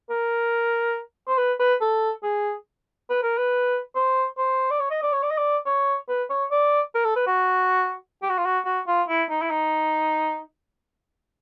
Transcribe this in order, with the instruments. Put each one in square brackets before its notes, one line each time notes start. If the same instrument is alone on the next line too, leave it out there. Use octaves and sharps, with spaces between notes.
[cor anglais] A#4
C5
B4
B4
A4
G#4
B4
A#4
B4
C5
C5
D5
C#5
D#5
D5
C#5
D5
D#5
D5
C#5
B4
C#5
D5
A#4
A4
B4
F#4
G4
F#4
F4
F#4
F#4
F4
E4
D#4
E4
D#4